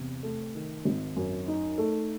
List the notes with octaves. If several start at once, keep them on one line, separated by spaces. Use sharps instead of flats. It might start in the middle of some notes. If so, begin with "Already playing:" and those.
Already playing: E2 C3
A3
D#3
G#1
F#2
D#4
A3